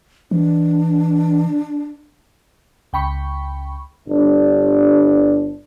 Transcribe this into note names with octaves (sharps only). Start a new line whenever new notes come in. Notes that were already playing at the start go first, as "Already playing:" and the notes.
E3 D4
C#2 G5 B5 C#6
G1 G2 D4